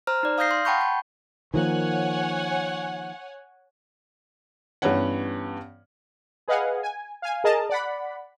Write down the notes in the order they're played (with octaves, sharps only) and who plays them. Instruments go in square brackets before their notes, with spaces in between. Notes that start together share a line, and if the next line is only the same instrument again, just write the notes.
[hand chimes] C5 A#5 F6
D#4 D5
F5 D#6 F6 G6 A#6 C7
C6
F#5 G5 A5 B5 C#6 G6
B5
[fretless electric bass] D#3 F3 A#3 [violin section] C#5 F#5 G#5
[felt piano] G2 E3 B3 C#4 C#5 F#5
[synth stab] G#4 B4 D#5 F5 F#5 G#5
G#5
F5 G#5
G#4 A#4 D#5 A5 A#5
D5 F#5 B5